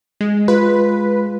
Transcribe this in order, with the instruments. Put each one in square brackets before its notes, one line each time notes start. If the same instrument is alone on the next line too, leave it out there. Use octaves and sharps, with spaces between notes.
[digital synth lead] G#3
[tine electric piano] G#3 F4 [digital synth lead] B4